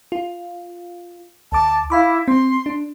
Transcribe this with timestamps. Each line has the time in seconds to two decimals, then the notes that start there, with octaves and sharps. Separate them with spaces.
0.12 F4
1.52 D2 A5 D6
1.90 E4 F5 B5 D6
2.28 C4 C6
2.66 D4